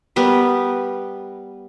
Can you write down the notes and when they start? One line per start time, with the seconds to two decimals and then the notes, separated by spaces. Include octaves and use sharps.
0.16 G3 B3 A#4 B4